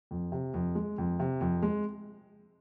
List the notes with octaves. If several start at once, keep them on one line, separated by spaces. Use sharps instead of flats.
F2
C3
F2
G#3
F2
C3
F2
G#3